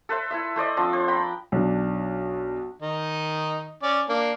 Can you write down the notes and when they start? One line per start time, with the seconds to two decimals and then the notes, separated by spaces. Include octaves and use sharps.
0.09 A4 B4 C5 E5
0.31 E4 B4 E5
0.56 A3 C5 D5 D#5
0.77 F3 C4 D4
0.93 C5
1.08 G5 A#5 B5
1.52 B1 D4
2.82 D#3 D#4
3.83 C#4 D5
4.09 A#3 D4